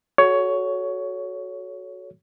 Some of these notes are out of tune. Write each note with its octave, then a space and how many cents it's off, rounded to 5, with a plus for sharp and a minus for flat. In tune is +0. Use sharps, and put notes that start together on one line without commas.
F#4 +0 A4 -30 C#5 +15